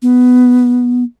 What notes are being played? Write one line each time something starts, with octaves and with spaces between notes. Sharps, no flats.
B3